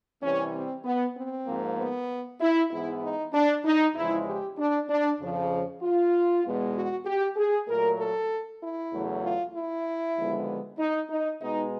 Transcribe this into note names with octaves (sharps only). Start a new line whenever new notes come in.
C2 C3 E3 G3 C#4
C4
B3
C4
G#2 F3 A#3
B3
E4
G#2 E3 G#3 B3 E4
D#4
D4
D#4
E2 C#3 F3 G#3 E4
G4
D4
D4
F2 C#3 F3
F4
E2 B2 G#3 B3
F#4
G4
G#4
A#2 F#3 A3 A#4
A4
E4
E2 C#3 F#3 A3
F4
E4
D#2 D3 F3 G#3 B3
D#4
D#4
B2 G#3 B3 D#4